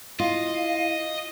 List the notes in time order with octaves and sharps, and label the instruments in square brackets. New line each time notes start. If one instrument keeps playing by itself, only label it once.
[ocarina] E4 [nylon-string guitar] F4 [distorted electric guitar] D#5 [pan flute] F5